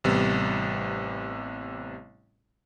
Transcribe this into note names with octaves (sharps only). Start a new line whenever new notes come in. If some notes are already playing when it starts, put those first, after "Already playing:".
A1 C3 G3 B3